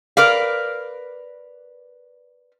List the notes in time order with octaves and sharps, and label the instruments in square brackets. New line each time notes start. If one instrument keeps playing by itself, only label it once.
[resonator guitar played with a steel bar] A#4 B4 D5 F5